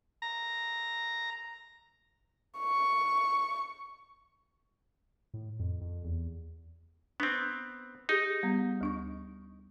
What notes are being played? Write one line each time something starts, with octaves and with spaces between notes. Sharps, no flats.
A#5
C#6
A2
F2
F2
E2
B3 C4 D4
D#4 G4 G#4
G3 B3
D2 D4 C#6